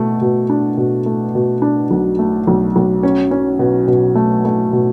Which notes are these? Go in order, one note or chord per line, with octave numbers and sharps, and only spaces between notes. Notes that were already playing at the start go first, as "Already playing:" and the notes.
Already playing: B2 A3
B2
D4
B2
A3
B2
D4
B1
A3
B1
B1
C#4
C#4
B2
B2
A3
A3
B2